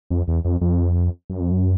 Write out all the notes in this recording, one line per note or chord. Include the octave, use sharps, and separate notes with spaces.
F2
E2
F2
F2
F#2
F2
F#2